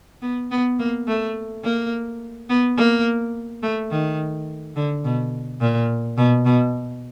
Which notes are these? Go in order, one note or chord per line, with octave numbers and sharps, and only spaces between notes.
B3
B3
A#3
A3
A#3
B3
A#3
A3
D#3
D3
B2
A#2
B2
B2